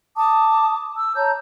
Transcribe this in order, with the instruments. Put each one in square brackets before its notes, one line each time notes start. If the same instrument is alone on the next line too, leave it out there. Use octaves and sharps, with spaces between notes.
[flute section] A5 D6 D#6
E6
C#5 A5 A#5 G6